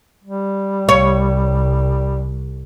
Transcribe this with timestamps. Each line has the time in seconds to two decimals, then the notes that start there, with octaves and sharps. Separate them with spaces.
0.24 G3
0.89 C2 C#5